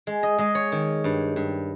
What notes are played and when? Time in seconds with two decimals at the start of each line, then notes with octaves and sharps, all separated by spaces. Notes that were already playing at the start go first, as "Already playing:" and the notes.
0.07 G#3
0.23 D#5
0.38 G#3 D#5
0.55 C#5
0.72 D#3
1.04 G2
1.36 G2